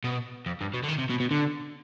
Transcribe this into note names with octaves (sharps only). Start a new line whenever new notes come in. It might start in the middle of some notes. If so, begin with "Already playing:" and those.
B2
F2
G2
B2
D3
D#3
C3
B2
B2
D3